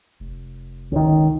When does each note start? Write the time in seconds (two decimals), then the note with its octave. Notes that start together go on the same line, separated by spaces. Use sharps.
0.20 F1
0.92 C#2 D#3